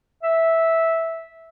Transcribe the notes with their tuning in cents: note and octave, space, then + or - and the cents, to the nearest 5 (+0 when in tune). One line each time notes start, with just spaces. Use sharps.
E5 -10